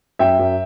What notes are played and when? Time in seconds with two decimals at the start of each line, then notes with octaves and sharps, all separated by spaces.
0.19 F#2 E5 G5
0.39 F#2